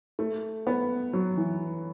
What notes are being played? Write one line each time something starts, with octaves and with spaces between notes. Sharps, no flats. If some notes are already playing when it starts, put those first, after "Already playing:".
A3
B3
F#3
E3